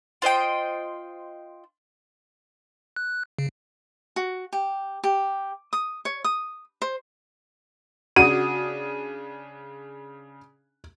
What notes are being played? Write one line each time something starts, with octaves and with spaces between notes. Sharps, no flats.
F4 C5 D#5 G5
F#6
C#3
F#4
G4
G4
D#6
C#5
D#6
C5
C#3 D4 F#4 D#6 D#7